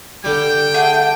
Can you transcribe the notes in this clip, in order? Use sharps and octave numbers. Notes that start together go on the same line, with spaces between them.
D3 G3 G5
A3 D4 G#4 F#5